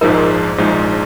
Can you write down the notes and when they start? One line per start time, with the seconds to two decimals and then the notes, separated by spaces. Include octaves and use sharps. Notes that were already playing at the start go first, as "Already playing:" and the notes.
0.01 A#1 G#2 F3 G#3 D#4 A#4
0.58 A#1 G#2 F3 G#3 D#4